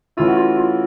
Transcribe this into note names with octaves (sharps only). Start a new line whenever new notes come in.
E3 A3 C#4 E4 F4
F#4
F4
F4